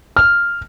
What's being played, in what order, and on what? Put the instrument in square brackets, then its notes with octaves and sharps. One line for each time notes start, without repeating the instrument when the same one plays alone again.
[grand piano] F6